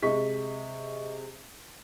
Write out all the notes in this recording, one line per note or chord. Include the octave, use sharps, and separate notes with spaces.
C3 G#3 D#5 C#6 B6